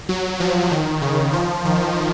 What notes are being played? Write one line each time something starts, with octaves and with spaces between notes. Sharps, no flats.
F#3
F3
D#3
C#3
F3
D#3